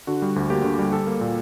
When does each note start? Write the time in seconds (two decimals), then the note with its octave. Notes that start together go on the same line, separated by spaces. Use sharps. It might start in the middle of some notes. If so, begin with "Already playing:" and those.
0.07 D3 F#4
0.22 G3
0.36 D2
0.50 A#3 G4
0.64 D3
0.79 G3
0.92 G3 A4
1.07 A#3
1.21 A#2